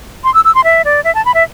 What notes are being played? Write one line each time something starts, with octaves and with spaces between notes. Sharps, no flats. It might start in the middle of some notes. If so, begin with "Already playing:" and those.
C6
E6
E6
C6
E5
D5
E5
A5
B5
E5